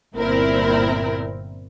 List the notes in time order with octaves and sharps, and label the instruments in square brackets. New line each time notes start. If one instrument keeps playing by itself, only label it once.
[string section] G1 A#2 C4 E4 A#4